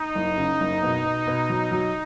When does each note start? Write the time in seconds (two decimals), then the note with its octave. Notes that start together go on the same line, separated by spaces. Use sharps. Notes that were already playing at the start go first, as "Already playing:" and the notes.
Already playing: D#4
0.15 F#1
0.38 C#3
0.61 F#1
0.82 B2
1.04 B2
1.27 B2
1.50 F#3
1.71 F#3